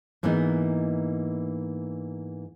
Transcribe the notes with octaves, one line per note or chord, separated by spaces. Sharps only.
G#2 E3 A#3 B3 D#4